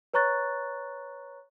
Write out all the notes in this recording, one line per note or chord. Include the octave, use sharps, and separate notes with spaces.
B4 C#5 A#5 C#6 F#6 A6